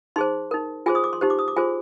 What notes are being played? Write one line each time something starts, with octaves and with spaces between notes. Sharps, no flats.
D#4 G#4 C5 C6
D#4 A#4
F4 G#4 C5 G#5
D#6
D6
C6
D#4 G4 C5
D6
D#6
D6
F4 G#4 C5 G#5